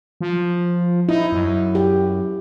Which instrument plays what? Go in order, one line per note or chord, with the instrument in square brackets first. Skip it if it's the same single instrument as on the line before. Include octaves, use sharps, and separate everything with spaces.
[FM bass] F3
[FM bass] D#4 [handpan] E4
[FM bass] F#2
[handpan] G4